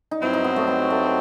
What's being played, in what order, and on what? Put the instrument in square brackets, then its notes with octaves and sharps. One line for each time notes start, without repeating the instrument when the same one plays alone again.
[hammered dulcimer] D#4
[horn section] G2 F#3 C4 [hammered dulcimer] E4
[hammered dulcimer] D#4
B3
A3
B3
A3